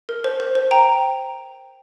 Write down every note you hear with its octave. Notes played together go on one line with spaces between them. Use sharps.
A#4
C5
C5
C5
G5 A#5